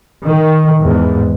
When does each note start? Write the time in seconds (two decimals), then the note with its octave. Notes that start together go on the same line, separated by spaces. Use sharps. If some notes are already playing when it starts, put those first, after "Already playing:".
0.24 D#3
0.83 E2 G#2